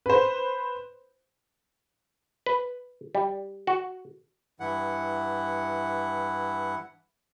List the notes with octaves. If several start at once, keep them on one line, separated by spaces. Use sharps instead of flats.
B4 C5
B4
G3
F#4
G2 E3 E4 F#5